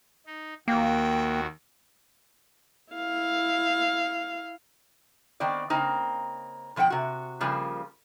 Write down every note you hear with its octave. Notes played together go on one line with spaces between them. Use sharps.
D#4
D#2 A#3 F#4 G5
E4 F5
D#3 B3 C4 D5
C#3 A#3 C4 D#4
B2 F3 C4 F#5 G5
C3 F#4
C#3 F3 G3 A#3